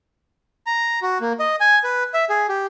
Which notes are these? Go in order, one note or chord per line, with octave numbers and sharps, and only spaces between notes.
A#5
F#4
A#3
D#5
G#5
B4
E5
G#4
G4